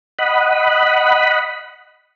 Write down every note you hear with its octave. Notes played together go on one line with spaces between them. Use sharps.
D#5 F#5 B5